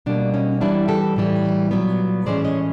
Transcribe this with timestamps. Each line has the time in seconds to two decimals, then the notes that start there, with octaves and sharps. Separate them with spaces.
0.06 B2 G3 A#3 D4
0.34 C#4 D#4
0.61 E3 G3 B3 D4 E4
0.88 G4 A4
1.16 A2 E3 G3
1.71 A#2 F#3 B3
2.26 A2 E3 G#3 C#4 C5 D5
2.45 C#5 D#5